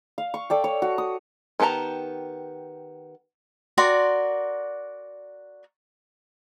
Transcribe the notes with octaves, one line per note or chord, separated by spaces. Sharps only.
F5
C#6
A4 D5 G5
C#5
F#4
D#6
D#3 B3 G4 A5 A#5
F#4 A#4 D5 C6